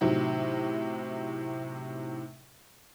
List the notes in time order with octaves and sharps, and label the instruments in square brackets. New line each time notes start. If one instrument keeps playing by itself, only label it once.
[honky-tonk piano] A2 C3 D#3 F#3